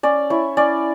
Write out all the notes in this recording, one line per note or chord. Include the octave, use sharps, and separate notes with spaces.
C#4 D5
E4 C#5
C#4 D5